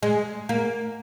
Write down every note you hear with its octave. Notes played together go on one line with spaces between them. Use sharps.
G#3
A#3